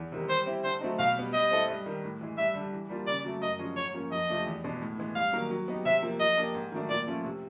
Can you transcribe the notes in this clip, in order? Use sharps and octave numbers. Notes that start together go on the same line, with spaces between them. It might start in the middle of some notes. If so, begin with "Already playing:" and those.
Already playing: E2
C3 D#3 G3
G3 C5
C4 E4 G4
D3 C5
F#3 A3 C4 D#4
B2 F5
G3 B3
G3 D#5
C4 E4 A4
G2
D#3 G3
A2
E3 G#3
G2 E5
D3 G3
E3
G3 A#3 D4 F4
C#3 D5
F#3 A3
F#2 D#5
D3 F3 G#3 C#4
G#2 C#5
F3 A#3 C#4
F2 D#5
C3 F3 A3 D4
E2
B2 G#3 B3 D4
A2
E3 G#3 B3
G2 F5
D#3 F#3 A#3
F#3
B3 D#4 G4
C3 E5
F3 A#3
F3 D#5
A#3 D4 G4
G#2
D#3 F#3 A3 D4
A#2 D5
F3 A3 C#4 F4
C3